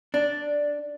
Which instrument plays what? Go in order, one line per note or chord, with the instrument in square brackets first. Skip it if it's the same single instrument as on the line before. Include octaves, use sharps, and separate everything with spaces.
[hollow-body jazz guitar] D4